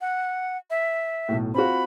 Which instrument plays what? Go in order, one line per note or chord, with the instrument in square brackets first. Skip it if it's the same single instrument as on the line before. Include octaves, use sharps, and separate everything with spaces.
[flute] F#5
E5
[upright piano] B1 A2
[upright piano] C4 F4 F#4 [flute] B5